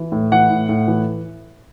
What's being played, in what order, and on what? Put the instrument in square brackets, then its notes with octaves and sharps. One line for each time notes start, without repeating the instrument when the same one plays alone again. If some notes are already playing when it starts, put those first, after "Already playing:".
Already playing: [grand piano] E3
A2
E3 F#5
A2
A2
E3